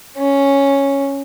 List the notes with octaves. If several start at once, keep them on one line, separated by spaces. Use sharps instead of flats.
C#4